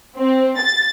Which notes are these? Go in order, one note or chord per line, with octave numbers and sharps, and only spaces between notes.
C4
A6